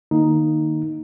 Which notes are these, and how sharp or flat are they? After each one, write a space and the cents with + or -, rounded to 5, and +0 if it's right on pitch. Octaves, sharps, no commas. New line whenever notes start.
D#3 -25 A#3 +0 D#4 +0